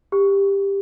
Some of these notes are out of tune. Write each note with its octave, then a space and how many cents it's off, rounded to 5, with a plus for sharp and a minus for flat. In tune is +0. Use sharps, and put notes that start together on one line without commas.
G4 +15